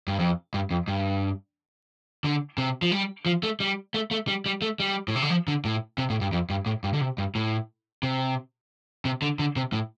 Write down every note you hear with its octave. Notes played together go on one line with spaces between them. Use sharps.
G2
F2
G2
F2
G2
D3
C3
F3
G3
F3
A3
G3
A3
A3
G3
G3
A3
G3
A2
C3
D3
F3
D3
A2
C3
A2
G2
F2
G2
A2
G2
D3
C3
G2
A2
C3
C3
D3
D3
C3
A2